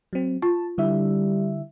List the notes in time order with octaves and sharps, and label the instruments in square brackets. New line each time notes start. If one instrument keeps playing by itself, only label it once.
[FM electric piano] F#3 C4
[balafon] F4 [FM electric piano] A5
[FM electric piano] D3 E4 E5 [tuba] G3